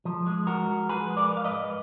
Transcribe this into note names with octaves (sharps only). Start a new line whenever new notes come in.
F3
G#3
G#2 F#4 A#4
G#2
F3 G#4 B4
G#3
A#4 D5
G#2
F5
B4 D#5
G#2